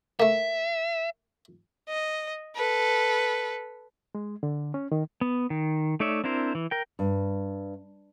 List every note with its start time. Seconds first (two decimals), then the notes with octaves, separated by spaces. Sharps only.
0.20 A3 A#3 E5
1.89 D#5
2.56 A4 B4
4.15 G#3
4.43 D3
4.74 C#4
4.92 D#3
5.21 B3
5.50 D#3
6.00 A3 D#4 C#5 D5 E5
6.24 C4 D4 E4 A#4 C5
6.55 E3
6.71 A#4 G5
6.99 G2